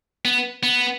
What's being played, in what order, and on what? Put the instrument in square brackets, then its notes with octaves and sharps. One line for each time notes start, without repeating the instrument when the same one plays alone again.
[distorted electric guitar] B3
B3